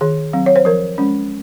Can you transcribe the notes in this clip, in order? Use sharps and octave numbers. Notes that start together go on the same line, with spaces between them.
D#3 G#4
F#3 C4
C#5
C5
F3 A#4
G#3 C#4